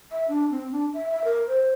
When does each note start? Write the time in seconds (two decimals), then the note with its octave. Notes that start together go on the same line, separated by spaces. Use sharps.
0.11 E5
0.28 D4
0.51 C4
0.72 D4
0.94 E5
1.10 E5
1.24 A#4
1.48 C5